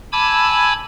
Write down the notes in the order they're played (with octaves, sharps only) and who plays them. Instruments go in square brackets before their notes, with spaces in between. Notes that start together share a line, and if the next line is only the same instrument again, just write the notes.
[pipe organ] G#5 A5 B5 D6 E6 G#6